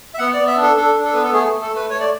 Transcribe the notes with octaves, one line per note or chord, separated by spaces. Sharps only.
E5
B3 F#5
B3 D5
E5
D4
A4
D4 A4
D4
A4
B3 B4
A4
A3 G#4
A3
A4
A3 B4
A3 C#5
D5